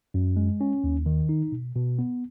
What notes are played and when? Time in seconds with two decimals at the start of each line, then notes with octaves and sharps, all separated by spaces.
0.14 F#2
0.36 G#3
0.61 C#4
0.84 D#2
1.06 D#3
1.29 D#4
1.52 B2
1.75 B2
1.99 B3